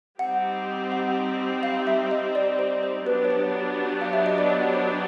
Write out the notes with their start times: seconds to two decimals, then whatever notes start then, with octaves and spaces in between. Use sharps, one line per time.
0.19 G3 C4 D#4 G4 F#5
0.92 F#5
1.63 F5
1.87 E5
2.11 D#5
2.35 D5
2.59 C5
2.83 C5
3.06 F#3 B3 D4 G4 B4
3.25 C#5
3.30 C5
4.01 F5
4.13 E5
4.26 D#5
4.38 D5
4.50 C#5
4.74 C5